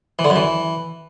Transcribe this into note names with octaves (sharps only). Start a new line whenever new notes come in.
E3
D3
F#2
E3